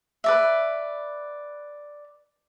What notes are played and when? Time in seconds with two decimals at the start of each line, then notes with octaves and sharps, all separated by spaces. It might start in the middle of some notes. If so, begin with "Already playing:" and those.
0.24 B4 D5 E5